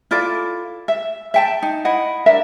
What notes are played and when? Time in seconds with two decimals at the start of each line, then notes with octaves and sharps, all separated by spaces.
0.11 E4 F4 A4 D5
0.88 E5
1.34 E5 G5 A5
1.62 D#4
1.85 E4 D#5 F#5
2.26 D4 A#4 E5